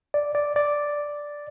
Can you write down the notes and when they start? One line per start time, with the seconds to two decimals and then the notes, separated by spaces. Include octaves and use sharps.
0.14 D5
0.35 D5
0.56 D5